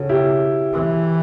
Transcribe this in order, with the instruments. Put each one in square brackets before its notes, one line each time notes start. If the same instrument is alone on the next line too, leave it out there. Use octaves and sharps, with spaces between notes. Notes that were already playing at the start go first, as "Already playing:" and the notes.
Already playing: [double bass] C#3 [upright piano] F#4 A4
[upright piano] E4 G4
[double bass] E3